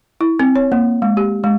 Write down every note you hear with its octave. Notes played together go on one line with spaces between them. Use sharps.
E4
C4
C#5
A#3
G#3
G4
G#3